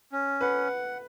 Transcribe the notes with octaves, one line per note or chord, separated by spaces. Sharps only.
C#4
B4 F#5